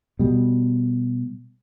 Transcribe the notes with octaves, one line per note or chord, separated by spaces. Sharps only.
B2 G3